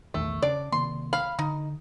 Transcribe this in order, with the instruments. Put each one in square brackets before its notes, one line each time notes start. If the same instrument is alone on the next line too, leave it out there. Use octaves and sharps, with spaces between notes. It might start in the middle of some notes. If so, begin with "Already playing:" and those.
[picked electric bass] A#1 E2 D#3 [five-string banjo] A3
[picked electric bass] C#3 [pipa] D4 [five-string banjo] D5
[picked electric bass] C3 D#3 A#3 [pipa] C6
[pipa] F5 [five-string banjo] B5
[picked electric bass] D3 [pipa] D#4